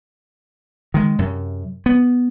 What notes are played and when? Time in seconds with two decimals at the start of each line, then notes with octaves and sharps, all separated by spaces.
0.94 D#3 G#3
1.19 F#2 C3
1.86 B3